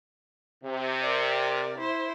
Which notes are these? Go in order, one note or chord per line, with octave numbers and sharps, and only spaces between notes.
C3
A#4 D5
E4 C5